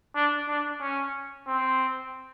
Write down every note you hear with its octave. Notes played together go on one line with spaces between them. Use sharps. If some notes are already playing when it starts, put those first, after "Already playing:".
D4
D4
C#4
C4